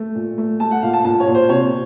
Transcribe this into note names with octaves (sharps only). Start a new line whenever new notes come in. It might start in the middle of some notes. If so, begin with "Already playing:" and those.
Already playing: A3
A#2
A3
A3 A5
F#5
A#2 F5
A5
A#2 A5
C#5
A#2
C5
C3 C#5